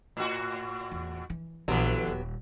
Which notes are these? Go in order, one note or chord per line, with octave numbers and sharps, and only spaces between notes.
A2 F#4
E2
E3
A#1 D3 E3 F#3 B3 G4
D#1